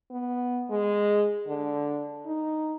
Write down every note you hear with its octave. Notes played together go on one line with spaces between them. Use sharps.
B3
G#3
D3
D#4